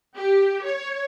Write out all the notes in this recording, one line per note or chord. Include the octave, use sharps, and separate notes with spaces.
G4
C#5